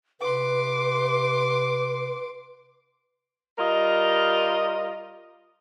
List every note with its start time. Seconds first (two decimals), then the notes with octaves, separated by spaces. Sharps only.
0.21 C3 B4 C6 D6
3.59 G3 F4 A#4 D#5